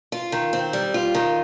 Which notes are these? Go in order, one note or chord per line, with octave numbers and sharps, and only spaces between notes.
F4
D#3
C4
G3
F4
D#3